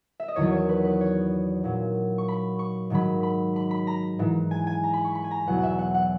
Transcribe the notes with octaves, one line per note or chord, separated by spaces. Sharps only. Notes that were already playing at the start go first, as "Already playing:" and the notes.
E5
D#5
E2 D#3 F#3 C#5
C#5
B4
B4
C#5
A#2 F#3
C#6
B5
C#6
G#2 D#3 F#3 B5
B5
B5
B5
A#5
G#2 E3
G#5
G#5
A#5
B5
C#6
B5
G#5
A#5
E2 B2 F#3 F#5
F#5
E5
F#5
F#5